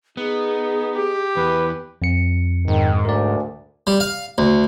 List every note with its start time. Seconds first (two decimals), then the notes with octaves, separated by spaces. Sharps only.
0.17 B3 D#4 G#4
0.96 G4
1.37 E2 B4
2.02 F2 C#7
2.68 G#2 D#3
3.05 D2 A#4 D5
3.87 G3
4.00 F5
4.38 D2